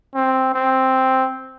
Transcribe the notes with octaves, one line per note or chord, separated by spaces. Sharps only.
C4
C4